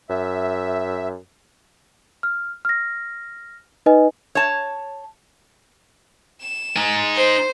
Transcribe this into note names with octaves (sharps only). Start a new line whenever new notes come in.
F#2 E5
F6
F6 A#6
D#4 B4 D#5 G#5
C#5 A5
E7
D#4 G#5
C5